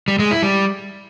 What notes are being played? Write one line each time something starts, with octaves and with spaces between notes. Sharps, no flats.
G3
G#3
E4
G3